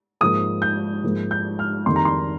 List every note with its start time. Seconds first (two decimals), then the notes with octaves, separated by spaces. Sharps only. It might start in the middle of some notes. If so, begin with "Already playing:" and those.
0.21 G#2 F3 A#3 D#6
0.62 G6
1.04 G#2 F3 A#3
1.31 G6
1.59 F6
1.86 F2 D#3 G3 A#3 C6
1.96 A#5
2.05 C6